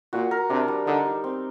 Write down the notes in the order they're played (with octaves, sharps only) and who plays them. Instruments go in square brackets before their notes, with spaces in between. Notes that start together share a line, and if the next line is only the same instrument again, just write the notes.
[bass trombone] A#2 [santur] F#4
[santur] A#4
[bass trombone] C3 [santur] D4
[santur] G3
[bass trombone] D3 [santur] D#4
[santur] G3
C4